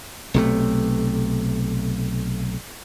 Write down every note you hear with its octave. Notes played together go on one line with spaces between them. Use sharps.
B1 C3 A3